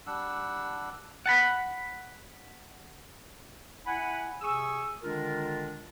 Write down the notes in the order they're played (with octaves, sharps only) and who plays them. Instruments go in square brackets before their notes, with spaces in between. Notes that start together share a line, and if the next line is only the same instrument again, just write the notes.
[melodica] G3 D4 F#5 E6
[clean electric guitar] F#5 A5 B5
[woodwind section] E4 F#5 G#5 B5
C3 G#4 G#5 C#6 D#6 E6
D3 D#3 G#3 D4 F4 A#4